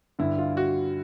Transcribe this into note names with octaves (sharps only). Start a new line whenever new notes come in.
G2 D3 E4
F4
F#4